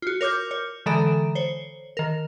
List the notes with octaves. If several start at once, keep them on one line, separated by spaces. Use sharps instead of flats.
F4 F#4
A#4 C#5 D6 F6 G6
C#5
D3 E3 G#3 A4 A#5 D7
C5 C#5
D#3 A#4